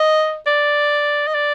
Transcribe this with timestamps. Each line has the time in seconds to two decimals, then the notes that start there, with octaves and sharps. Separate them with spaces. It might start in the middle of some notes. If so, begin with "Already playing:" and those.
Already playing: D#5
0.47 D5
1.27 D#5
1.35 D5